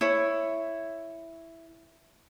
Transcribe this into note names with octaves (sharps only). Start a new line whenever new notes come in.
E4 C#5